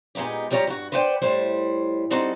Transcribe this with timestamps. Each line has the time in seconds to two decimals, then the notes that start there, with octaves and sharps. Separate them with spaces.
0.15 A#2 G#3 B3 D#4 G4
0.50 F3 G3 G4 C#5 A#5
0.67 G2 F#4
0.92 B4 C5 D5 F#5 G5
1.22 A2 G3 C5
2.10 G3 C4 D#4 F#4 A4